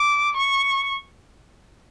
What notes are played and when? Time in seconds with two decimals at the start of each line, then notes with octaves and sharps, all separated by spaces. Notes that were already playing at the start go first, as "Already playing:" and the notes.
Already playing: D6
0.37 C#6